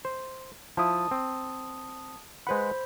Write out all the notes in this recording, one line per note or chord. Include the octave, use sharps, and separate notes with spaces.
C5
F3 E4 A5 D#6
C4
G#3 B4 C5 F#5 B5